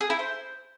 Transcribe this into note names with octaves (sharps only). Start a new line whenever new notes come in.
G#4
E4
C5